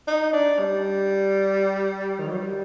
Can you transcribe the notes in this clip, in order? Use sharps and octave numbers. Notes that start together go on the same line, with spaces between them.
D#4
D4
G3
D#3
F#3
G3